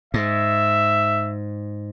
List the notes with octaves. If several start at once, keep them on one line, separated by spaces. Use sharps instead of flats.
G#2 E5